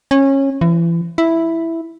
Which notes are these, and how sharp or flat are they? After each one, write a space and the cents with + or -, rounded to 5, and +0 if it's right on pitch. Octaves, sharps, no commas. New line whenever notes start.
C#4 -20
E3 +35
E4 +0